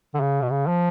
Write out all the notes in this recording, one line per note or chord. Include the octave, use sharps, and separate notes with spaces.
D3
C#3
B2
C#3
F3